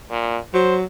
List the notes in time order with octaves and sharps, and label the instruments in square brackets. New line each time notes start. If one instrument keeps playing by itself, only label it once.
[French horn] A#2
[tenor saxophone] F#3 [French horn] C5